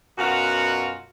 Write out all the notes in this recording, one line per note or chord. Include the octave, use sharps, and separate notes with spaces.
F#2 B2 F4 F#4